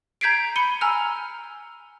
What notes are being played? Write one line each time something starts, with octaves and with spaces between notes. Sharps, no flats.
A#5 G6 G#6 B6 C7 D7
B5 C#7 D#7 G7
G#5 A#5 E6 F6